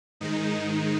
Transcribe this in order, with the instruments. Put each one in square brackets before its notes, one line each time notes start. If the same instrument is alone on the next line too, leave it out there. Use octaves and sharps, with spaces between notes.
[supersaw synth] G#2 D#3 G#3 D#4